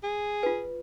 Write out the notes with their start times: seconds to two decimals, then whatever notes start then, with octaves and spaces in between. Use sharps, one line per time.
0.03 G#4
0.43 F4 B4